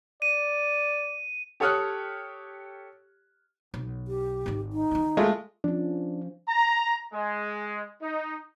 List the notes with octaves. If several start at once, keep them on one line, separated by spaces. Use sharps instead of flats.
D5 D#7
G4 A4 C#5 D#6 F6 F#6
B1
G4
G#1 D#3
D#4
D3 D#3
G#3 A3 F4
F3 C#4 D4
A#5
G#3
D#4